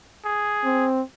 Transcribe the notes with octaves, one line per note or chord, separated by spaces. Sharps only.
G#4
C4